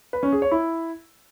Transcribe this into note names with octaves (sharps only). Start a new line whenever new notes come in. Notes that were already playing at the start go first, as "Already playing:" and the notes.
B4
C#4
G#4
C#5
E4